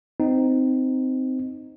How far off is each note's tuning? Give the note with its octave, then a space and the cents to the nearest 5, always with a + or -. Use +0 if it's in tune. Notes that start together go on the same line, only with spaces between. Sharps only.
C4 -15 D#4 +0